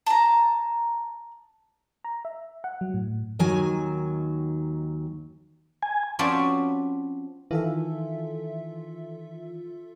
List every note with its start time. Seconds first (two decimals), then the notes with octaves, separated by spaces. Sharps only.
0.06 A5 A#5
2.05 A#5
2.25 E5
2.64 F#5
2.81 F#3
2.94 A2
3.39 D#2 D#3 F#3 G#5
5.83 G#5
6.19 F3 C4 C#4 F#4 B4 D5
7.51 D#3 E3 F4 A4 E5